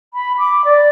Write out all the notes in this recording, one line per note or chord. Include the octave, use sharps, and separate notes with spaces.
B5
D6
D5